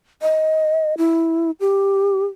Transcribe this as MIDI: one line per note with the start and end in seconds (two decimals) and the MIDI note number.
0.22 0.94 75
0.98 1.51 64
1.60 2.25 67